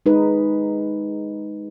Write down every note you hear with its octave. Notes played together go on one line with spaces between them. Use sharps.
G#3 D#4 B4